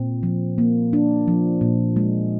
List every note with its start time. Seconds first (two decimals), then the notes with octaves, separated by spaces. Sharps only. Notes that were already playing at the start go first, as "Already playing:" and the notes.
Already playing: A#2 C4
0.23 F3
0.58 A#3
0.93 D4
1.28 F3
1.61 A#2
1.96 G#3